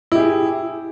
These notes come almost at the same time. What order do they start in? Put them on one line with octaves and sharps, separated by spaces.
E4 G4 G#4